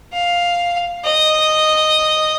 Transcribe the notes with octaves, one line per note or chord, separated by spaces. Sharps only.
F5
D#5